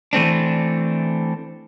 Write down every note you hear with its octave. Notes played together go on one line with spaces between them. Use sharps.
E3 A3 C4 D4